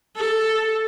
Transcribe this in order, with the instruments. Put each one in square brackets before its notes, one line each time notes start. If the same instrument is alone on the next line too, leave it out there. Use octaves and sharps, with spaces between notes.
[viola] A4